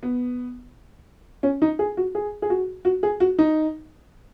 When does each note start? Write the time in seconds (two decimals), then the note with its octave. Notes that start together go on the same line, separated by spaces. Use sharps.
0.03 B3
1.43 C#4
1.62 D#4
1.79 G#4
1.97 F#4
2.15 G#4
2.42 G#4
2.50 F#4
2.85 F#4
3.03 G#4
3.20 F#4
3.39 D#4